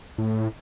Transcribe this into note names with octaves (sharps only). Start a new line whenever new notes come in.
A2